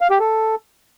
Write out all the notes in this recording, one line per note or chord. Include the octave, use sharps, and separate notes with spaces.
F5
G4
A4